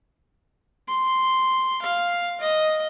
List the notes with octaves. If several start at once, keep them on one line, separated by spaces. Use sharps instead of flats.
C6
F5
D#5